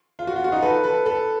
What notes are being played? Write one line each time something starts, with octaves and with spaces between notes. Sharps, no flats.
F4
F#4
F4
F#4
D#4 F4
A4 B4
A4 B4
A4 B4